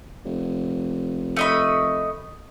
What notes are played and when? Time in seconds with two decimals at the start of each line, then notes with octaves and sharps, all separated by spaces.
0.25 F1
1.36 A3 D#5 B5